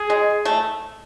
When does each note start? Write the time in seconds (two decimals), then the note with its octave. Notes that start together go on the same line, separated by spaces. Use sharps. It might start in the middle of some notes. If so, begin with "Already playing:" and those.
Already playing: G#4
0.10 G#3
0.45 A3